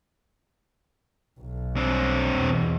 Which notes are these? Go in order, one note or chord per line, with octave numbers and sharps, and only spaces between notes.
B1
C4 D4
E2 B2